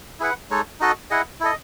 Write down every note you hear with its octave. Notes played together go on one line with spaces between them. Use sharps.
E4 G#4 B4 F#5
G#3 D#4 A4 C#5
D#4 F#4 A4 D#5
E4 G#4 D#5 F#5
E4 A4 D#5